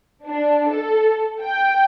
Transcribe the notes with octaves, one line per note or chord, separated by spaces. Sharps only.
D4
A4
G5